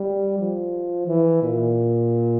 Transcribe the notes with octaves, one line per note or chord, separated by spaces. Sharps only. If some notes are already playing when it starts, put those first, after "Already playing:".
Already playing: G3
F3
E3
A#2